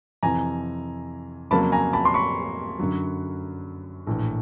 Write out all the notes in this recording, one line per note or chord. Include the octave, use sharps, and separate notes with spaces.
F2 C3 E3 G#5 A#5
F2 C#3 F#3 A#3 A5 B5
G#5 A#5
A5 B5
C6
B5 C#6
F#2 D3 F#3
A#1 A2 E3